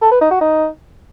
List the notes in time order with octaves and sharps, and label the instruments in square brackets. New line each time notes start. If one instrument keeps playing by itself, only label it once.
[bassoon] A4
B4
D#4
F#4
D#4